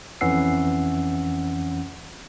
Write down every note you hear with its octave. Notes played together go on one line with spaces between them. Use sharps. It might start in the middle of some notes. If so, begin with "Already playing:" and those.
F2 E3 C#4 F#5 E6 C7